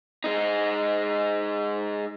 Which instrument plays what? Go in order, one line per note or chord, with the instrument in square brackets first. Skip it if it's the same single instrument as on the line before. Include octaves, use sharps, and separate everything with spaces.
[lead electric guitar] G#3 D#4